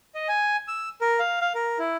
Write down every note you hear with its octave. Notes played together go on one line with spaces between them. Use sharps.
D#5
G#5
E6
A#4
F5
F5
A#4
E4